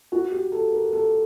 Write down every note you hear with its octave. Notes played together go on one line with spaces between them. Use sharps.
F#4
G4
A4
A#4
A4